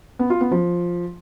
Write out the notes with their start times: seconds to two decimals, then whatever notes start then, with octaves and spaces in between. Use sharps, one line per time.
0.19 B3
0.30 F4
0.41 B3
0.51 F3